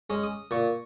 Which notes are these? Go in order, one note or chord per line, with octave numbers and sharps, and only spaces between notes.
G#3 C#4
D#6
A#2 C#6